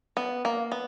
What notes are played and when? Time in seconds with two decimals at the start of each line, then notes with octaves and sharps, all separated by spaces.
0.17 B3
0.45 A#3
0.72 B3